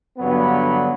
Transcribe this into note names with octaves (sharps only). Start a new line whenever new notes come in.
G2 D3 F#3 B3